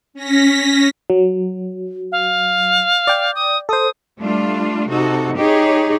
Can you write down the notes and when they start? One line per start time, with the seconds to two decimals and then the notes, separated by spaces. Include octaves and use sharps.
0.13 C#4 A#6 B6
1.10 F#3
2.12 F5
3.07 D5 G5
3.35 D#6
3.69 A4 C5 D#6
4.20 G3 A3 D4 F4
4.90 C3 D#4 F#4 A4
5.38 D#4 G4 G#4 C#5